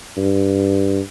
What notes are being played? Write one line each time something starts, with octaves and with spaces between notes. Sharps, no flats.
G2